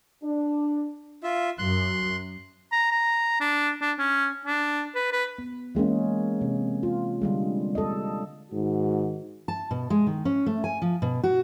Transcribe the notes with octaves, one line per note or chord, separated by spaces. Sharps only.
D4
F4 E5
F#2 C6 F#6
A#5
A#5
D4
D4
C#4
D4
B4
B4
B3
E3 G#3 A#3 C#4
C3
F4
D3 G3 G#3
A4 D#5
G#2 D#3 F#4
A5
B2
G#3
D#3
C#4
A3
G#5
F3
B2
F#4